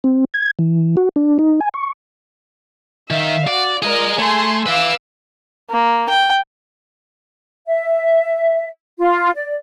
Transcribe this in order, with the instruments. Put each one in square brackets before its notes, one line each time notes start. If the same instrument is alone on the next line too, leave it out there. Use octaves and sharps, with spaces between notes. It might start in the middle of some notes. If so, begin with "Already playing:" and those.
[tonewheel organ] C4
G#6
E3
F#4
D4
D#4
G#5
C#6
[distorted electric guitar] D#3 [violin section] E5 F5
[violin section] F#4 [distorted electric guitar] D5
[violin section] F4 A#4 D5 [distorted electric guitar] G#4 D#5
[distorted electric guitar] A3 [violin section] G#4 G#5 C6
[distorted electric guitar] B4 E5 [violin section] F5 D6 E6
[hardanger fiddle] A#3
G5
[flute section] E5
F4
D5